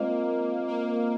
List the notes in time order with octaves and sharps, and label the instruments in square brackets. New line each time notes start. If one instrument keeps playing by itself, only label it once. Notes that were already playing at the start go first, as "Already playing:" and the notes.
Already playing: [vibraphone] G#3 C4 F4 C5 D#5 [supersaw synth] A#3
[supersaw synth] A#3